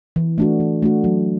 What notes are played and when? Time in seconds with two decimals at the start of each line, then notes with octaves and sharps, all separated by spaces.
0.16 E3
0.38 A3 D4 F#4
0.60 E3
0.82 A3 D4 F#4
1.04 F#3